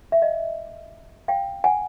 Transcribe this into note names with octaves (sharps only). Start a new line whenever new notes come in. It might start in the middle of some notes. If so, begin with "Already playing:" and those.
E5
D#5 F5
F5 G5
F#5 G#5